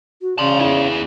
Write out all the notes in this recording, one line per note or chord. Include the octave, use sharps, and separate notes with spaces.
F#4
C#3 D5 A5 C6
E4 G#4